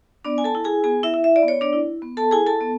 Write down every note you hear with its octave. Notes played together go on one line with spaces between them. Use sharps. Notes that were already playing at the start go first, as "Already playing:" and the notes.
B3 D4 D5
G#5
A4 A5
E4
G#4 G#5
B3 G#4 G#5
E4 E5
E4
E5
D5
B3
C#5
D4 D5
E4
B3
A4 A5
E4 G#4 G#5
A4 A5
B3